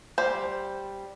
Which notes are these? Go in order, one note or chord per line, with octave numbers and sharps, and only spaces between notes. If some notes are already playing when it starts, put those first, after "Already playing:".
G3 C5